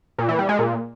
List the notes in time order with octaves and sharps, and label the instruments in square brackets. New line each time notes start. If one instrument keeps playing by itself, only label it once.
[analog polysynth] A#2
E3
G3
G#3
A#2